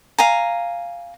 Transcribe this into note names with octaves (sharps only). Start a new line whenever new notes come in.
F5 G#5 A#5